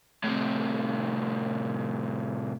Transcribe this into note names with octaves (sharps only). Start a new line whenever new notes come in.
A2 C3